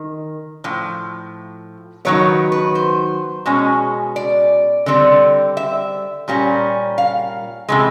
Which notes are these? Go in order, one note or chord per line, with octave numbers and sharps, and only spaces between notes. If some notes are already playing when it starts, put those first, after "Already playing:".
Already playing: D#3
A2 F3
D#3 F#3 B3 C#5
B4
C5
B2 G#3 C#4
D5
D3 G3 C4
E5
A#2 G3 A#3 C#4
F5
C3 E3 G#3